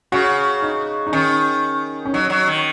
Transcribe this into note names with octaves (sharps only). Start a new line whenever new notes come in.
C#3 F#4
D#4
D#4
D#3 C#4
C#4
F#3 D#4
F#3
D#3